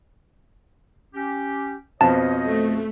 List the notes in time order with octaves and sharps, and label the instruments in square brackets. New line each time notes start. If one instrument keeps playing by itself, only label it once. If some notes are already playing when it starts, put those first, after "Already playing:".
[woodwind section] C#4 G4
[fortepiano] F2 B2 F3 [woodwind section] C5 C#5 D#5 [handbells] A5
[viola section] A3